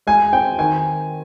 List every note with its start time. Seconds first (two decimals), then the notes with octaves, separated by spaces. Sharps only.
0.07 G#3 G#5
0.33 C4 G5
0.58 D#3 G#5